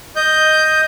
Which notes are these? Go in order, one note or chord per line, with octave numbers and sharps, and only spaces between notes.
D#5 G6